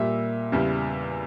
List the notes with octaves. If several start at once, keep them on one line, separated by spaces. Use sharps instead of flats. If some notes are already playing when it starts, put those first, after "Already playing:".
Already playing: A#2 G3 E5
E2 C#3 G3